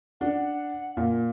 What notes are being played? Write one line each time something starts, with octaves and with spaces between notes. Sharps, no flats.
D4 F#5
A#2